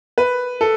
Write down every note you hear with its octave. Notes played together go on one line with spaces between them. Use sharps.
B4
A4